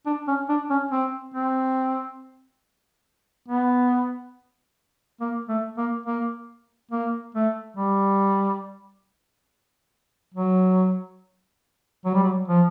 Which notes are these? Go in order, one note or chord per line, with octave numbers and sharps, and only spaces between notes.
D4
C#4
D4
C#4
C4
C4
B3
A#3
A3
A#3
A#3
A#3
A3
G3
F#3
F#3
G3
F#3
F3